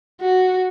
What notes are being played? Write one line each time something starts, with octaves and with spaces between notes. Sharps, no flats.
F#4